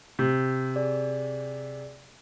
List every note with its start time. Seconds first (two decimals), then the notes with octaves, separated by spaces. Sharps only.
0.19 C3 G6
0.76 G#4 D5